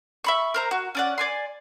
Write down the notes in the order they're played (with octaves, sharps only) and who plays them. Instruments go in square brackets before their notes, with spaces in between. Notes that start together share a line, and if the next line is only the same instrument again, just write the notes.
[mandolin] E5 B5 C#6
A#4 C5 A#5
F#4
C#4 D5 F#5
D5 G#5 C6